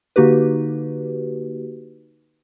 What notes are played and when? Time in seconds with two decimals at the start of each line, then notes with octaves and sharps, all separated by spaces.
0.16 D3 A#3 D#4 F#4 G4 B4